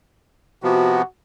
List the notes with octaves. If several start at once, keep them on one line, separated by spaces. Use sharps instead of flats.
C3 F3 B3 F#4